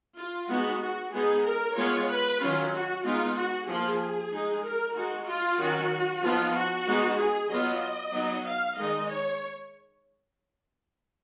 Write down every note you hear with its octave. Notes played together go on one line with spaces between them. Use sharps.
F4
G#3 B3 D#4 F#4
F#4
G#3 B3 D#4 G#4
A#4
G#3 B3 F4 C#5
B4
D#3 F#3 C#4 F4
F#4
G#3 B3 D#4 F4
F#4
F3 A#3 F4 G#4
G#3 D#4
A#4
G#3 D#4 F#4
F4
D#3 F#3 C#4 F#4
F3 B3 D#4 F4
F#4
G#3 B3 D#4
G#4
F#3 B3 F4 D#5
F#3 B3 D#4
F5
D#3 G#3 D#4 D#5
C#5